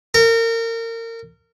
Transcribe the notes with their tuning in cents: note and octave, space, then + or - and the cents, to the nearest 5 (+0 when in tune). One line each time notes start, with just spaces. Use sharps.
A#4 -30